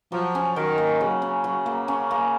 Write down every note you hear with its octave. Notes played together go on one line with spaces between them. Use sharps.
F3 F#3
C#4
D#3 F#3
A#3
C#3 F#3
C#4
F#3
A#3
C#4
A#3